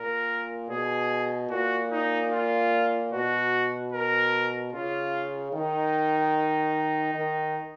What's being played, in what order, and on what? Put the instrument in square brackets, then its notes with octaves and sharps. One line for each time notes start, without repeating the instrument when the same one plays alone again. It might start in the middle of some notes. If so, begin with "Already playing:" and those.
Already playing: [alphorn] A#2 [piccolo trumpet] A#4
[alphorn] B2 [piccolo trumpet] G#4
[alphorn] A#2 [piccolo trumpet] F#4
[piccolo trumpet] D#4
F4
[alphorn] B2 [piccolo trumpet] F#4
[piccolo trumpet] A#4
[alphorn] C#3 [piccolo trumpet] F4
[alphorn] D#3 [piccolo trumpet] D#4
[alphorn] D#3